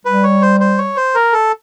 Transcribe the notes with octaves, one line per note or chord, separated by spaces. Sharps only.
G3 B4
C#5
C5
C5
C#5
C5
A#4
A4